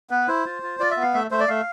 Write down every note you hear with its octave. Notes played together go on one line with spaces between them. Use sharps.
B3 B4
E4 C5
F4
F4
F4 D5
E5
B3
F5
A3 E5
A3 C5
D5
A3 F5